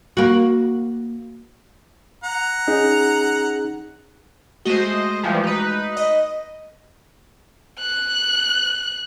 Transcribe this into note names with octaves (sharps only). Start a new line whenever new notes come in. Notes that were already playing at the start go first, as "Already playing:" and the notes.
A#3 F#4
F#5 A#5
C#4 D#4 G#4
G#3 A3 F#4 C5 D#5
E3 F3 G3
D#4 B4
D#5
F#6